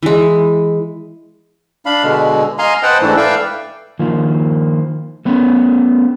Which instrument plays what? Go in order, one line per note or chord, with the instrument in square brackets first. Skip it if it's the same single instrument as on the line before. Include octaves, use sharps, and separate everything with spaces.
[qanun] E3 G#3
[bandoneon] D4 F5 B5
B2 D3 G#3
D#5 F5 G#5 A#5 C6
B4 C5 D#5 F#5 G5 A5
G#2 E3 A3 D4 E4
A4 B4 D5 E5 F5 G5
[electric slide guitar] D#3 F3 A#3
A3 B3 C#4